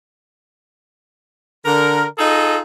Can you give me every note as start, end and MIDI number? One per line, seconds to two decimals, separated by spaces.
1.66 2.04 50
1.66 2.04 70
2.19 2.59 63
2.19 2.59 65
2.19 2.59 68
2.19 2.59 69
2.19 2.59 75